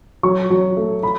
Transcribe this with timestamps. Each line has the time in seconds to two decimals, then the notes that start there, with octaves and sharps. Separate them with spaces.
0.23 F#3 C#6
0.50 F#3
0.77 A3
1.03 B5